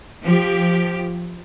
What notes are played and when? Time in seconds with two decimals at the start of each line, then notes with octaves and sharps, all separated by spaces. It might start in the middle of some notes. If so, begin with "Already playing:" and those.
0.22 F3 G4